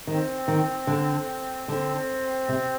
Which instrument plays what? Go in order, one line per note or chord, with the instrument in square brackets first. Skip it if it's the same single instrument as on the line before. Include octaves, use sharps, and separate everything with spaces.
[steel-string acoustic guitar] D#3 [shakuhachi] C4
[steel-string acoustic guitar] D#3
D3
[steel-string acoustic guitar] D3 [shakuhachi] C4
[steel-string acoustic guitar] C3